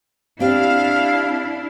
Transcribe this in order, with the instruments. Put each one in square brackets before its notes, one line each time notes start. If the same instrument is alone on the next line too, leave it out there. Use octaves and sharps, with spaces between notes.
[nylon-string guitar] C4 G4 [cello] D4 E4 [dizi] F5